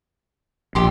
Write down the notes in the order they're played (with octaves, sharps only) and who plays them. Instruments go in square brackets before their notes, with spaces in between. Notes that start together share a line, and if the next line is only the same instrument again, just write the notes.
[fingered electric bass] A#1 [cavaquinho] G4 C6